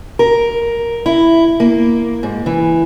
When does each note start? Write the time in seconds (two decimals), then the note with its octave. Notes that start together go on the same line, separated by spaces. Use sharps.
0.19 A#4
1.06 E4
1.60 A#3
2.23 G#2
2.46 E3